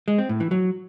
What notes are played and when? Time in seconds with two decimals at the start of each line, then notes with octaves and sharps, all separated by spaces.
0.08 G#3
0.18 C4
0.29 A2
0.40 E3
0.51 F#3